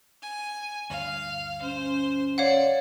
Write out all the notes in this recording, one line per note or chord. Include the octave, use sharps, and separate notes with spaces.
G#5
D2 G2 F5
C#4 C5
C#5 D5 F5 F#5